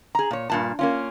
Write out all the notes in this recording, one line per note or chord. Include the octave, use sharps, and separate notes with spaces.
G#4 A#5
A#2 C#5
G2 A#2 A5
A#3 C#4 F4